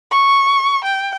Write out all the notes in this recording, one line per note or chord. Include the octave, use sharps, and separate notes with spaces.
C#6
G5